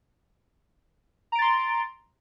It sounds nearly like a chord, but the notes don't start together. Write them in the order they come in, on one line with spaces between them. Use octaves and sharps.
A#5 D7 A6 C6